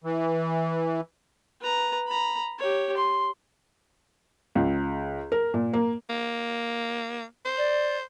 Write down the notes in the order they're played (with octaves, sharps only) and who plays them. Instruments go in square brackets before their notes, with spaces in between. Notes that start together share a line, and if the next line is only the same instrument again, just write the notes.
[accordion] E3
[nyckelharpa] B4 A#5
A#5 B5
G4 C#5
C6
[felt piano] C#2
A#4
A#2
A#3
[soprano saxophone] A#3
C5
[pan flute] D5